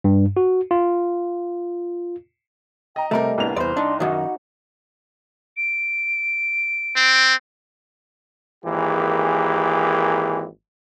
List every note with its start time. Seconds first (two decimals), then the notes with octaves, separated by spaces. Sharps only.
0.04 G2
0.37 F#4
0.71 F4
2.96 D#5 G5 A#5
3.11 C3 G3 A3 A#4 D#5
3.38 C2 A#3 B3 D4 F7
3.57 E2 B4 C5 D5 C6
3.77 D4 D#4 D5
4.00 F#2 D#3 D#4 F#4 D5 F#5
5.57 D7
6.96 C4
8.65 G#1 E3 A#3 G4 G#4